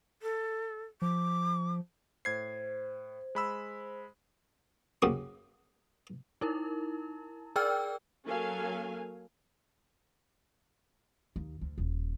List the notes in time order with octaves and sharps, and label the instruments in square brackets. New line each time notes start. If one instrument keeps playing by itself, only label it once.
[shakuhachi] A4
[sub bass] F3 [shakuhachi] D6
[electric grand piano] A2 G#6 C7 [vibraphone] C5
[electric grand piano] G#3 B5 E6
[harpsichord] F#2 C#3 A#3 F#4 G4 D#6
[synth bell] D#4 E4 A#4
G#4 A#4 D5 G5 E6 F6
[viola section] F#3 A#3 C#4 A4 F5 G#5
[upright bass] D#2
D2
D#1